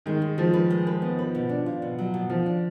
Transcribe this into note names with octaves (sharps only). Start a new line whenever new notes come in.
D#3 G#3
G#3
F3 G#3
B4
G#3
B4
B3
B4
B2
D4
F4
B2
F#3
B2
F3 F4
D4